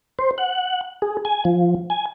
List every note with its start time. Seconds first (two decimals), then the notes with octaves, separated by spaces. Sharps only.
0.19 C5
0.38 F#5
1.02 G#4
1.25 G#5
1.45 F3
1.90 G#5